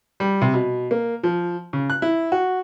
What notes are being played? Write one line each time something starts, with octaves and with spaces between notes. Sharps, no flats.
G3
C3
B2
A#3
F3
C#3
F#6
E4
F#4